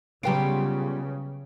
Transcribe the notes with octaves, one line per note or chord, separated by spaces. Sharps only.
C#3 F#3 G3 B3 F4 G5 D7